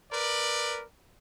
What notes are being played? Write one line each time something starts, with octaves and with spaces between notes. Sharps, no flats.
A#4 B4 D5